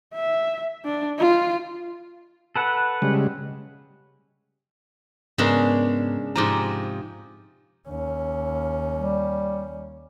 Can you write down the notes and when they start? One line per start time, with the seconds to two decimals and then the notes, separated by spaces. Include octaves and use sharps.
0.14 E5
0.85 D4
1.19 F4
2.56 A4 B4 F#5
3.02 C#3 G3 G#3
5.38 G#2 C#3 G#3 B3 D4 A#4
6.36 G#2 C3 F3 A#5 D6
7.88 D#2 C#4
8.95 G3